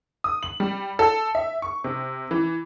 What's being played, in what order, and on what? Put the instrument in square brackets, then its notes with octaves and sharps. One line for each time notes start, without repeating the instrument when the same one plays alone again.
[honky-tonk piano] D#6
F#7
G3
A4
E5
C#6
C3
E3